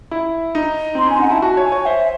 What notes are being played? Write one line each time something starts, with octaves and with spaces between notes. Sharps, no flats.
E4
D#4
C4 C6
C#4 G#5
D#4 F#5
G#5
E4 A5
F#4 A5
C#5
G#5
C#5
C5 E5